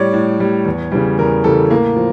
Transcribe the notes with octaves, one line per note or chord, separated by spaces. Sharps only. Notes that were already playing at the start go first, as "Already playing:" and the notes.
Already playing: A2 G3 C#5 D5
A2
G3
E2
C#3 E3 G3
E2 A#4
C#3 E3 G3 A4
A2 A#3
F3